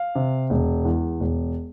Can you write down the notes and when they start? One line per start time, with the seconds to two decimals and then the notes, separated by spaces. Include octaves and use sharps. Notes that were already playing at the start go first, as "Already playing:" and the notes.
Already playing: F5
0.15 C3
0.50 E1
0.85 E2
1.20 E1